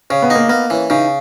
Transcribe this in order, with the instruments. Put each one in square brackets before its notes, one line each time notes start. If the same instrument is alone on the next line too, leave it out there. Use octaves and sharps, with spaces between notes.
[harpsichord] C#3 [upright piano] C#4
[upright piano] B3
[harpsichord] D#4
[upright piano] A#3
[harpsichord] A#3 [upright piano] B3
[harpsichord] E3 [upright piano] C#4
[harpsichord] C#3 [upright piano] D#4